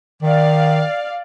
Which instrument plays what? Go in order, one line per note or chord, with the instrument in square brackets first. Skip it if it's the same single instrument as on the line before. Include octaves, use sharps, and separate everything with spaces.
[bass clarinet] D#3 [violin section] D5 F5